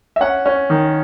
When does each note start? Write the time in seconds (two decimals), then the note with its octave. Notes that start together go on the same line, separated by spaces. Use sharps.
0.16 E5
0.21 C#4 F#5
0.46 C#4
0.70 D#3